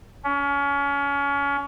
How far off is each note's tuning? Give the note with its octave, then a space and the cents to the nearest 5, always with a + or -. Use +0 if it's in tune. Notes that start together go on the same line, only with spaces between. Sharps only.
C#4 +30